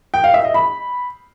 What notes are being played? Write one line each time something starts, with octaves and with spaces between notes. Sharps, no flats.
G5
F5
E5
D#5
B5